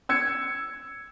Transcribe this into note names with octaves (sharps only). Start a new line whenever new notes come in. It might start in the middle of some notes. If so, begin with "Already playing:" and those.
E6 G#6 C#7